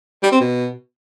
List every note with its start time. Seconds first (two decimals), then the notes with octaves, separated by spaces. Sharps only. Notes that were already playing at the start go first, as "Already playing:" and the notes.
0.23 G3
0.32 C4
0.40 B2